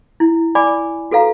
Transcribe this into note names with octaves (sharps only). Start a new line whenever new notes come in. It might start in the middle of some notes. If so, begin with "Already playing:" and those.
E4
D5 G#5 B5 D6
F#4 A4 B4 F5 A#5